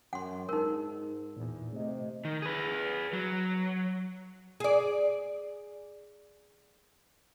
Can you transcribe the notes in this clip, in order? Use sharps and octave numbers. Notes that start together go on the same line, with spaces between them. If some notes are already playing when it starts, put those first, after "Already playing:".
F#2 F#5 C6
G#2 D#4 A#4
E2 A#2
C3 A3 D#5
D#3
G#4 B4
F#3
G#4 D5